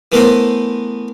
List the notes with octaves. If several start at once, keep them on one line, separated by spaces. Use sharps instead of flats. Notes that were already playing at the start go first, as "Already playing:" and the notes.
E3 A3 B3 A4 A#4 C5